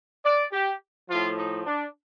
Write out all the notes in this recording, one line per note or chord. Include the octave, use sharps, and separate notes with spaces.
D5
G4
A2 F3 F4
D#4
D4